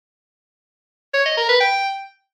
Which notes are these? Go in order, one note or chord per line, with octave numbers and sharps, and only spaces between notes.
C#5
D#5
A#4
B4
G5